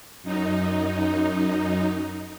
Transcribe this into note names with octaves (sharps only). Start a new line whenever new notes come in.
F#2 D#4